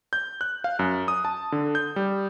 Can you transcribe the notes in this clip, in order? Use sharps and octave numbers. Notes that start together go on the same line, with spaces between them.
G6
F#6
F5
F#2
D#6
A5
D3
G6
G3